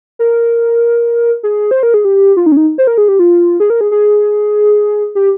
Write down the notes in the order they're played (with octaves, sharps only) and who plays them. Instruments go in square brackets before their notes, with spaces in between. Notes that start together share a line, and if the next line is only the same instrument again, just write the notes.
[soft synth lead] A#4
G#4
C5
A#4
G#4
G4
F4
D#4
C#4
D#4
C5
A#4
G#4
G4
F4
G#4
A#4
G#4
G#4
G4